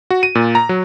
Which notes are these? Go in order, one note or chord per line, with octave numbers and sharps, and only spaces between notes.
F#4
D#7
A#2
A#5
F#3